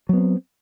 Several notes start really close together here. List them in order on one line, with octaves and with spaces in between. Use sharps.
F#3 B3 C4